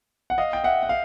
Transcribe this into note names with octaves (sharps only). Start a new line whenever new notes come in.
F#5
D#5 F5
G5
E5 F#5
F#5
F5